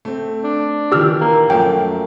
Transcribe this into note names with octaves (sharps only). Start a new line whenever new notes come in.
A3 C4
D4
A#2 D#3 E3 G4 E6 F6
A#3
F#2 F3 A3 A#3 G5